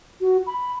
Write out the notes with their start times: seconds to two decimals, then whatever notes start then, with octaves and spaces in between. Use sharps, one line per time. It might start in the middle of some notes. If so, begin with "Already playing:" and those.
0.21 F#4
0.47 B5